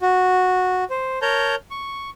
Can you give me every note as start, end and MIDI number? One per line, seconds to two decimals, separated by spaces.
0.01 0.84 66
0.90 1.19 72
1.22 1.55 70
1.22 1.55 73
1.22 1.55 81
1.22 1.55 82
1.22 1.55 91
1.71 2.10 85